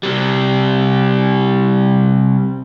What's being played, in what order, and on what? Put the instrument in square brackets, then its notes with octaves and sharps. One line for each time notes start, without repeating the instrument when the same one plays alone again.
[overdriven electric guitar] C3 G3